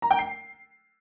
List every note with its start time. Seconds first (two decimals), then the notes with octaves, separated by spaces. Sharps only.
0.02 A#5
0.11 G5
0.19 C7